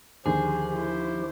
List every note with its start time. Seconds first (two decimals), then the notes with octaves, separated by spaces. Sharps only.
0.26 D#2 D3 F3 G4 G#4 C5
0.71 E4 C5